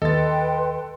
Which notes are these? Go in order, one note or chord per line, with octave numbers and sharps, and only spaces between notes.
D#2 A4 B4 D#5 G5 C6 A6